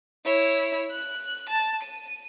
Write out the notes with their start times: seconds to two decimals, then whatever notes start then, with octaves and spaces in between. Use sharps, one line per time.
0.25 E4 C#5
0.91 F#6
1.49 A5
1.83 D#7